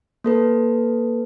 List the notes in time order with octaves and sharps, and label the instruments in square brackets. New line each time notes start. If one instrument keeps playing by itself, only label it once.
[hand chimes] A#3 A4 B4